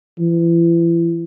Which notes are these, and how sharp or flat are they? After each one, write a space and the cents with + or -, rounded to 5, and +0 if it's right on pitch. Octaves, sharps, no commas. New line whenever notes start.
E3 +35